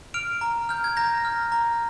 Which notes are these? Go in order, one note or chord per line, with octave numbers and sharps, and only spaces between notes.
F6 D7 F7
A#5
F6 G6
G#6
A#5 G6 A#6
F6
A#5